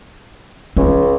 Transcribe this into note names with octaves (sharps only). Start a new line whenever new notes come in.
C#2 C#4